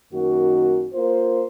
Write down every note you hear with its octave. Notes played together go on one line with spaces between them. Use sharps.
F#2 D#3 A#3 F#4
A#3 F4 C5